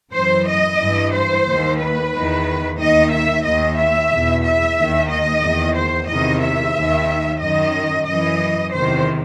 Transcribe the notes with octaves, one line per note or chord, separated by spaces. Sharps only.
F#2 E3 C5
D#5
G2 E3
C5
D#2 D#3
B4
E2 D#3
D#2 D#3 D#5
E5
D#2 D#3 D#5
E5
E2 B2
E5
D#2 D#3
D#5
E2 D#3
C5
E2 C3 D#3 D#5
E5
D#2 D#3
F#2 D#3 D#5
F#2 E3 D#5
E2 C3 D#3 C5